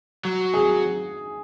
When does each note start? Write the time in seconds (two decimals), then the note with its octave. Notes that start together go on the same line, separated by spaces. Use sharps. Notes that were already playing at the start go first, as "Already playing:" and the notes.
0.25 F#3
0.54 G#4